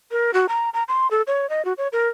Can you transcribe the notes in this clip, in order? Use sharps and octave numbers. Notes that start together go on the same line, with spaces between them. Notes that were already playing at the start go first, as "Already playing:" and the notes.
A#4
F#4
A#5
A#5
C6
A4
C#5
D#5
F#4
C#5
A#4